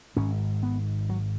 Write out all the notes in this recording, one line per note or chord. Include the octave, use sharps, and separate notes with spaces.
G#1 G#2 C#4
B3
F#3